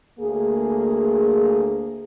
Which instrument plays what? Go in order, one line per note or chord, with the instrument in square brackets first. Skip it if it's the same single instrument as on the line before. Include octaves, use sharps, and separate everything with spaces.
[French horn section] D2 A#3 G#4